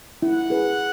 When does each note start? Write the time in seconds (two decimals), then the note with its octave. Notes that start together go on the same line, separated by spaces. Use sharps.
0.22 E4 F#5
0.50 G#4 B4